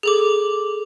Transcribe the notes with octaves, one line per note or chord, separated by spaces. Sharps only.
G#4 A4 D6